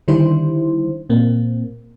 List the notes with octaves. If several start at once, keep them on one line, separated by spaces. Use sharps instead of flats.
D3 D#3 G3 E4 C5
A#2 A#3 C4